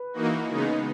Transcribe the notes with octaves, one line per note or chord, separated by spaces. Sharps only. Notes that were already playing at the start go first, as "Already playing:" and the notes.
Already playing: B4
E3 A#3 D#4 F#4
C#3 G#3 B3 D#4